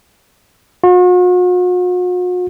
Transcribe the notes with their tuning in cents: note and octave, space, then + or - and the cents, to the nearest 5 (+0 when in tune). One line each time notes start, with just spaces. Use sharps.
F#4 -45